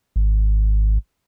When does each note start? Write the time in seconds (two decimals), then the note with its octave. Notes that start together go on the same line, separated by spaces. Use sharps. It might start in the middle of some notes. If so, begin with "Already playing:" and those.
0.16 G#1